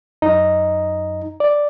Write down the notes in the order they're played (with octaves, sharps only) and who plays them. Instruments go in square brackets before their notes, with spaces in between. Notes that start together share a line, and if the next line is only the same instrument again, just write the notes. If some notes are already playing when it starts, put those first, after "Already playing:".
[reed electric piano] F#2 D#4 D#5 A#5
D5